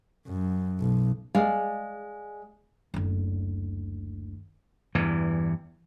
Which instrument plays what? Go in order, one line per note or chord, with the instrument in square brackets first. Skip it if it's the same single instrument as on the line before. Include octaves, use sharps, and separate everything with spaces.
[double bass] F#2
B1
[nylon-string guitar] G#3 D5 F5
[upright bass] F#1 D2
[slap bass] E2 G2 E3